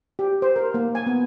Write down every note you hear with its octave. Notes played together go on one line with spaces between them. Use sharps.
G4
C5
A#4
A#3
G#5
B3